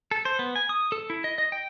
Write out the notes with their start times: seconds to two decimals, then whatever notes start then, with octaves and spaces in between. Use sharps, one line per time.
0.11 A4
0.25 C5
0.39 B3
0.56 G#5
0.69 D#6
0.92 A4
1.10 E4
1.24 D#5
1.38 D#5
1.52 G5